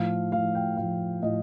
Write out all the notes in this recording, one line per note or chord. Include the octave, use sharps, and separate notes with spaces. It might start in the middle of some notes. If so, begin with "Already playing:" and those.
Already playing: A2 F3 F5
A2 F3 F5
G5
A2 F3 F5
A2 F3 D#5